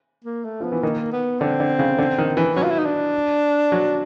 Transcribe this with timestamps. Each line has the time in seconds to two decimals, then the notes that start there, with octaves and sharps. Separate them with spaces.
0.24 A#3
0.45 A3
0.60 F3 B3
0.72 E3
0.82 D#3 A#3
1.12 B3
1.40 D3 C4
1.60 D3
1.79 C#3
1.98 D3
2.18 D#3
2.37 E3
2.56 F#3 C#4
2.63 F4
2.70 E4
2.79 D#4
2.85 D4
3.72 F#3